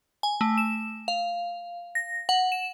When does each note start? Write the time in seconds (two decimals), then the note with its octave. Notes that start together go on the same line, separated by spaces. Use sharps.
0.23 G#5
0.41 A3
0.58 E7
1.08 F5
1.95 A#6
2.29 F#5
2.52 E7